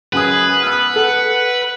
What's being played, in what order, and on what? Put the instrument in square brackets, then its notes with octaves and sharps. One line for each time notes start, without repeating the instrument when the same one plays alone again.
[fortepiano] F#2 D#6 [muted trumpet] G#4 [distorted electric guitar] B4
[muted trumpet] B3 [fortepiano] E6 F6
[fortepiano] A4 [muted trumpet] F#5